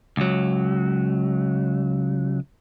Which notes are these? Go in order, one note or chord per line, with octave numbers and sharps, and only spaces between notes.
C#2 F#3